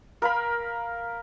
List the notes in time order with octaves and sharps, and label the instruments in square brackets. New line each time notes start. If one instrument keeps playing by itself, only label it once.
[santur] A#4 F5 B5